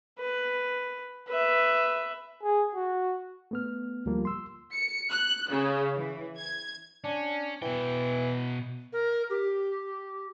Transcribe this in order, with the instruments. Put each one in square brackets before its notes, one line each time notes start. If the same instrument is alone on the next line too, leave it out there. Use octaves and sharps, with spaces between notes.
[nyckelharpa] B4
B4 E5
[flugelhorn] G#4
F#4
[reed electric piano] A3 B3 F6
D2 F3 G3 A#3 F4
C6 E6
[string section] C#7
F#6
C#3
E3
G#6
[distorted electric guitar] C#4 [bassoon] D4
[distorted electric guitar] B2 G5 [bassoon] E3
[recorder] A#4
G4